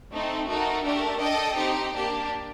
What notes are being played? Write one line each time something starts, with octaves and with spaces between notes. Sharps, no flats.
A3 C4 D#4
A3 D#4 F#4 A#4
A3 D4 G4 A#4
D4 A4 D#5 G5
C4 D#4 G4
A#3 D4 G4